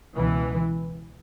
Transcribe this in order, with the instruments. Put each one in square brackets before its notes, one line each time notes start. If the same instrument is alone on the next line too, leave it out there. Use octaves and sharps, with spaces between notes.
[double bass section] C#2 B2 E3